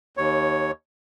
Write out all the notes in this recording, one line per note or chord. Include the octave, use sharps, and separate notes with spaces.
D#2 C#5